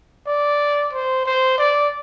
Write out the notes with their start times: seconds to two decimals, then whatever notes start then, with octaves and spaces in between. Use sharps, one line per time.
0.26 D5
0.93 C5
1.26 C5
1.58 D5